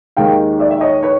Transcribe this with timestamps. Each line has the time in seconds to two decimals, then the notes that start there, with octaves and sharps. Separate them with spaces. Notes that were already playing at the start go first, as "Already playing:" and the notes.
0.17 D#2 D#3 G#3 F5 G5
0.59 D5 E5
0.71 E5
0.81 C#5 D#5
1.03 B4 C#5